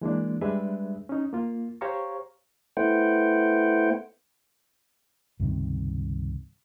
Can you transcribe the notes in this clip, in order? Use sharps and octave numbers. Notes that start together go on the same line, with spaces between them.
E3 G#3 A#3 D4
G3 G#3 D4 G#4 B4 E5
C#4 D#4
A#3 F4
G4 C5 C#5 F5 A#5 C#6
A3 B3 E4 C5 F#5 G5
C#2 G2 C3 D#3